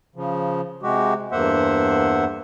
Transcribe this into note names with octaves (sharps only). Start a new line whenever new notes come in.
C#3 F3
C3 G#3 F#4 G4
E2 G2 A#3 C5 E5 F#5